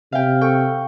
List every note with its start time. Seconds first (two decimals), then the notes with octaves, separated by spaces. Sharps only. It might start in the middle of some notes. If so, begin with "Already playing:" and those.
0.12 C3 E5 F5 G5
0.41 A4 G5 C#6